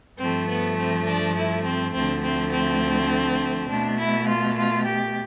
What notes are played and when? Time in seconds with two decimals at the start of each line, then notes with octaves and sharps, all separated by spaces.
0.19 G2 F3 A3 C4
0.49 B3
0.77 C4
1.06 D4
1.36 E4
1.64 C4
1.94 D2 D3 F3 A3 C4
2.23 C4
2.52 C4
3.68 B2 A3 D4
3.98 E4
4.27 F4
4.56 F4
4.85 G4